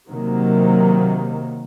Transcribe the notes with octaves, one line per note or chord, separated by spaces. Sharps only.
C3 D#3 F#3 A#3